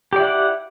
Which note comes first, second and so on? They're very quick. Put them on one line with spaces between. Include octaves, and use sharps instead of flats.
G4 D5 E4 F#5